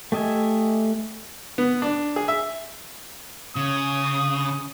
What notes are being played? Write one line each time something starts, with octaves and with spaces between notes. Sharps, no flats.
A3 G4 D#5 E5 G#5
B3
D4
G#4
E5
C#3 D#6